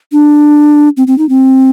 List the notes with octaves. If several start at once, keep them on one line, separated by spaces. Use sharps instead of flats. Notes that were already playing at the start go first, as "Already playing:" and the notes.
D4
C4
C4
D#4
C4